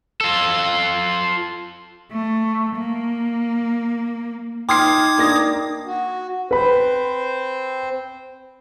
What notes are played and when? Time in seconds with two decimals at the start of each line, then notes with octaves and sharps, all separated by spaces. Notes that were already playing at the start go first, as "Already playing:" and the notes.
0.21 F4 A4
2.12 A3
2.75 A#3
4.69 D#4 G5 C6 D6 D#6 F6 G#6 C7
5.18 A#3 D4 A#6
5.85 F#4
6.51 C4 B4 C5 B5